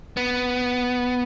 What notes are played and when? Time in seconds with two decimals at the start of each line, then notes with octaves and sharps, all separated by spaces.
0.17 B3